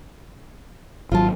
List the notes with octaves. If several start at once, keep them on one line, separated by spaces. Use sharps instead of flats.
G#1 F#3 F4 A5